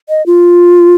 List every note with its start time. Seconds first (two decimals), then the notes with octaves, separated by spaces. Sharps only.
0.09 D#5
0.26 F4